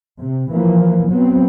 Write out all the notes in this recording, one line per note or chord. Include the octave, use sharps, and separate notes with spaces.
C3
E3 F3 A#3
F#3 B3 C4